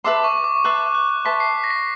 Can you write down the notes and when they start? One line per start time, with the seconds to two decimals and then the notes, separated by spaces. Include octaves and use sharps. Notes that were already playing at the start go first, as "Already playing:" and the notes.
0.04 B4 E5 A5 C6 D6
0.24 C#6
0.44 D6
0.64 B4 E5 A5 C6 F#6
0.95 F#6
1.09 F#6
1.25 B4 E5 A5 C6 B6
1.40 C7
1.64 A#6
1.70 B6